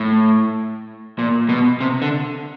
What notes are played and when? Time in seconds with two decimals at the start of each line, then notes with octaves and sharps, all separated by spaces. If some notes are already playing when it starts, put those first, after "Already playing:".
Already playing: A2
1.19 A#2
1.49 B2
1.81 C3
2.02 D3